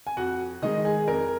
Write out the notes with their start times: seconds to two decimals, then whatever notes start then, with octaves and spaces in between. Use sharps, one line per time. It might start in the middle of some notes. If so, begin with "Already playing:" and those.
0.07 G#5
0.17 F2 F#4 F#5
0.62 D#3 G#3 D#4 D#5
0.85 G#4
1.08 F2 A#4